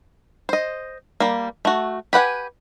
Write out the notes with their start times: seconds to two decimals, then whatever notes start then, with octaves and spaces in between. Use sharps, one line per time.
0.49 C5 D#5
1.20 G3 A#3
1.65 A3 F#4
2.13 G4 B4 F#5 G#5